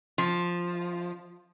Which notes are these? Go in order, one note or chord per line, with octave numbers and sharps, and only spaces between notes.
F3